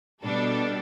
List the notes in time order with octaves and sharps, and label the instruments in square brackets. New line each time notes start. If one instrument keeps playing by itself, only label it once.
[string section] B2 G3 D4 A4